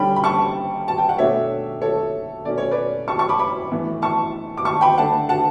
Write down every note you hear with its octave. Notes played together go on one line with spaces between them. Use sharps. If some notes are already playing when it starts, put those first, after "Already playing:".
Already playing: D3 G3 C#4 G5 B5
B5
A5 C#6
A5
G5
F#5
B2 A3 D4 C#5 E5
A4 C#5
B2 A3 C#4 D5
C#5
B4 D5
A5 C#6
A5 C#6
B5 D6
B5 D6
A2 E3 B3
A5 C#6
D6
A5 C#6
G5 B5
D3 A3 D4 F#5 A5
F#5 A5